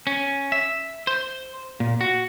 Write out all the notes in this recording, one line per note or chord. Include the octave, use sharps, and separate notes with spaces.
C#4
E5
C5
A#2
F#4